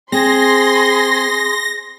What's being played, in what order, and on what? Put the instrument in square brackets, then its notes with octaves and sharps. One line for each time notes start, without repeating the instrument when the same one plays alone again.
[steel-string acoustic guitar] C4 [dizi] G#4 [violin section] C6 [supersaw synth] A#6